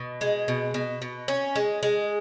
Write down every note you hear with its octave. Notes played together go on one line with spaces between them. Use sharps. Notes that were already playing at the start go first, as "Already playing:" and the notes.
Already playing: B2
G#3
B2
B2
B2
C#4
G#3
G#3